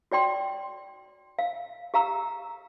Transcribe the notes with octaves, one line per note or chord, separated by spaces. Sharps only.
F#4 D5 G5 C6
F5
G4 F5 A#5 E6